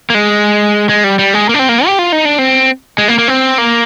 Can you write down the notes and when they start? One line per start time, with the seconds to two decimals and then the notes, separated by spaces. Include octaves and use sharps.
0.10 A#3
0.15 G#3
0.89 G#3
1.04 G3
1.19 G3
1.34 G#3
1.49 A#3
1.54 D4
1.59 C4
1.69 A#3
1.86 G4
1.99 F4
2.12 D#4
2.25 D4
2.39 C4
2.98 G#3
3.08 A#3
3.18 A#3
3.28 C4
3.58 A#3